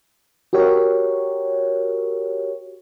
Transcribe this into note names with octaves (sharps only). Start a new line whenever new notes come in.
F#4 G4 A#4 C#5